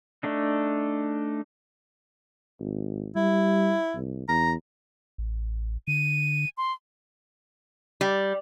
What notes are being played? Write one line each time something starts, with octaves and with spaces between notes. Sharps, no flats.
A3 D4 D#4
G#1
G3 E4
C2
E2 A#5
A1
D3 D#7
C6
G3